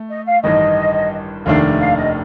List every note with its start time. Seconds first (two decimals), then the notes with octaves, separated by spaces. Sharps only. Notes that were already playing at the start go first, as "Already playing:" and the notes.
Already playing: A3
0.09 D#5
0.26 F5
0.43 A1 G2 D#3 D#5
1.46 F1 D#2 D#3 A3 D4 F5
1.81 F5
1.97 D#5